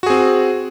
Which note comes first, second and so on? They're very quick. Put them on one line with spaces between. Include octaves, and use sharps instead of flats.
F#4 G#4 C4